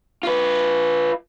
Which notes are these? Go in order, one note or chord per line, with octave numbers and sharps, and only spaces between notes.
F4 B4